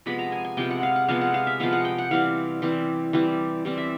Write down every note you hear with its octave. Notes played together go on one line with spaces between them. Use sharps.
C3 F3 G#3 B3 B5
A#5
G#5
G#5
C3 F3 G#3 B3 G5
F#5
F5
F#5
C3 F3 G#3 B3 F5
F#5
F5
E5
C3 F3 G#3 B3 F5
F#5
G5
F#5
E3 G3 C4 F5
E3 G3 C4
E3 G3 C4
E3 G3 C4
E5